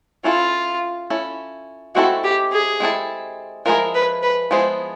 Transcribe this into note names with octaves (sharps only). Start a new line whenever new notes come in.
C#4 E4 F4 A4
C#4 E4 A4
G#3 C4 E4 F#4 A4
G4
G#4
G#3 C4 E4 A4
F3 G#3 B3 E4 G#4 A#4
B4
B4
F3 G#3 B3 E4 G#4 C5